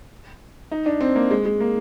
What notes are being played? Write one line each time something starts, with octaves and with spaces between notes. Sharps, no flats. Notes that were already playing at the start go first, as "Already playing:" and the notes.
D#4
D4
C4
A#3
G#3
G#3
A#3